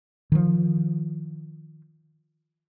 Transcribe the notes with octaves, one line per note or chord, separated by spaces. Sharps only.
D#3 F3